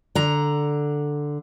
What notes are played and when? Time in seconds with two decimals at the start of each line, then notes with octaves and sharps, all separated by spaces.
0.15 D3 A#5